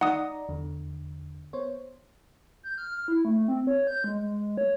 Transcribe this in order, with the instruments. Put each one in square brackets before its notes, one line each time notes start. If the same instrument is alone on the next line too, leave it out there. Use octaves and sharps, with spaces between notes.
[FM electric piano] D#4 D5 A#5 [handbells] F#5 D#6
[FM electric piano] E2 D3
B3 C5 C#5
[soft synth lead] G6
F6
E4
A3
C4
C#5
G6
G#3
G#3
C#5